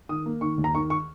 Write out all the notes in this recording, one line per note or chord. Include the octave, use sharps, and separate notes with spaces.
D#3 D#6
A#3
D#3 C#6
D#2
A#5
D#3 C#6
C#6